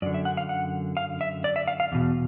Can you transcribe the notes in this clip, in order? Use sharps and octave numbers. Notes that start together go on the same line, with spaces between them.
F#2 D3 D5
E5
F#5
F5
F#5
F5
E5
D5
E5
F5
F5
E2 B2